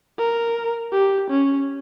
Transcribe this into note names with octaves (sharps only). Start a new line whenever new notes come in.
A#4
G4
C#4